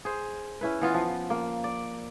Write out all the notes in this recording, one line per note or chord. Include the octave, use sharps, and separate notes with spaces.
G#4 C5
C#4 E4 B4
E3 B3 F4
F3
A#3
D5